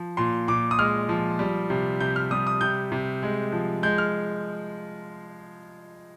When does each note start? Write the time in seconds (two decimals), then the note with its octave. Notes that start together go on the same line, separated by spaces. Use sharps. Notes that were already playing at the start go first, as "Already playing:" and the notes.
Already playing: F3
0.17 A#2 C6
0.48 A#2 D6
0.71 D#6
0.78 G#3 F6
1.09 F3
1.39 G3
1.70 C3
2.00 C3 G6
2.16 F6
2.31 G3 D#6
2.47 D#6
2.61 C3 G6
2.92 C3
3.23 G#3
3.52 F3
3.83 G#3 G6
3.98 F6